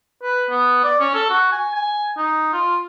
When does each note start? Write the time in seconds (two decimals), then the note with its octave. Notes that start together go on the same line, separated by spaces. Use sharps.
0.22 B4
0.50 B3
0.84 D5
1.00 C#4
1.15 A4
1.30 F#4
1.52 G#5
1.75 G#5
2.17 D#4
2.53 F4